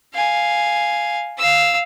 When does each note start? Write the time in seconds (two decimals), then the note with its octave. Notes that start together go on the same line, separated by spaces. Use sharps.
0.14 F5 G#5
1.38 F5 E6